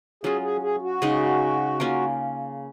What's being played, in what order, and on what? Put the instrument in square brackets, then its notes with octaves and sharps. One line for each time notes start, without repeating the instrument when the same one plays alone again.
[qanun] F#3 C#4 F4 [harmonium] G#4
[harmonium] G#4
G#4
F#4
[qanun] C#3 G#3 D#4
A#3 C#4 F4 A#4